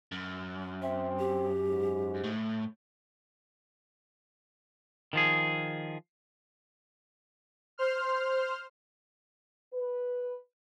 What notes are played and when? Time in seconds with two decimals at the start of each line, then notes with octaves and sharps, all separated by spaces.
0.12 F#2
0.82 C4 E5
1.18 G4
1.68 G#2
2.24 A2
5.13 D#3 F3 G#4
7.78 C5 C6 F6
9.74 B4